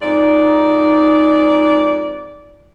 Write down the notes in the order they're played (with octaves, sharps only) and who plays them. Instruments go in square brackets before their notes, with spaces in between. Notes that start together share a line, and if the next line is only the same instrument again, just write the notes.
[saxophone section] F2 G#2 D5 [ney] D#4